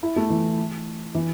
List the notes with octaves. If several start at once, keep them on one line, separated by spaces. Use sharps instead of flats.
E4
A3
E3
E3